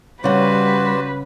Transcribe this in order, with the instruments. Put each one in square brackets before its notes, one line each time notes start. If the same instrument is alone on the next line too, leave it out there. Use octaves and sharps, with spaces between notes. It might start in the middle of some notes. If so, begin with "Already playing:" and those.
[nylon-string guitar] C#3 F#5 [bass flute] G3 [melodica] F#4 C5 D5 [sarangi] B4